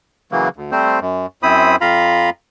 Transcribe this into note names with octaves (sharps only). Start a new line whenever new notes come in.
C#3 E3 F#3 A#3
D2
G3 A3 C4 C5
F#2
F#2 C4 E4 C5 B5 D#6
F2 F4 F5 A#5 B5